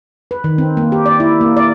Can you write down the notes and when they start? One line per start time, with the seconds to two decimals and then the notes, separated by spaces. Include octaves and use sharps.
0.31 B4
0.44 D#3
0.58 C4
0.77 A#3
0.92 G4
1.06 D5
1.20 E4
1.41 A#3
1.57 D5